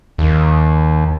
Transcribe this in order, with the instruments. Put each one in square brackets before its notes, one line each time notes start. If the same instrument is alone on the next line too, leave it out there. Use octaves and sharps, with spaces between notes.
[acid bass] D#2